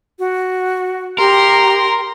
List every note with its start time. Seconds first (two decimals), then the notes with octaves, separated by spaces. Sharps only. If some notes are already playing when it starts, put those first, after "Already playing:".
0.19 F#4
1.18 G4 A#4 A#5 C6